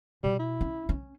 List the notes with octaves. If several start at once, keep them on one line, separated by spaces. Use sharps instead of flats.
B2 G3
E4
C#4
C#4